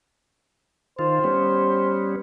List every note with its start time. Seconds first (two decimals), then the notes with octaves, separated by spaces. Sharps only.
0.99 D#3 F4 C5
1.24 G3 B3 C#4